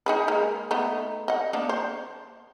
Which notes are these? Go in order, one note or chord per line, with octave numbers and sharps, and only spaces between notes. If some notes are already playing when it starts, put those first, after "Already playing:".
D#4 G#4 B4
G#3 A#3
A3 B3 D#4
D#5 F#5
A#3 B3 D4
C5